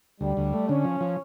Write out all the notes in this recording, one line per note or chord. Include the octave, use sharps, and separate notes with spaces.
D2 G3
D2
A3
D3 C#4
F3
F3